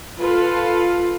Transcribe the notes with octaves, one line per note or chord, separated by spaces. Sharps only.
F4 A4 B4 F5